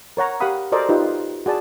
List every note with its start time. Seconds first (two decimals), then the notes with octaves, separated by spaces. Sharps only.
0.17 A#4 C#5 F#5 A#5
0.40 G4 A#4 F5 F#5 B5 D#6
0.72 F#4 A4 A#4 C5 D5 D#5
0.89 D#4 F4 G4 B4
1.46 F#4 G#4 D5 A5